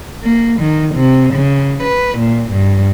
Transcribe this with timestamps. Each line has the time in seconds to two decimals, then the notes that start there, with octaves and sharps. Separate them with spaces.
0.23 A#3
0.61 D#3
0.96 C3
1.34 C#3
1.83 B4
2.19 A#2
2.52 G2